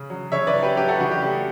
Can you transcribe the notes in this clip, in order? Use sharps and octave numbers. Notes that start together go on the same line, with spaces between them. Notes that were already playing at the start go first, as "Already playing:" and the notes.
Already playing: C#3
F#3
C#3 C#5 E5
B4 D5
F#3
G4 B4
F#3 G4 B4
F#4 A4
C#3 F#4
G4
A3 G4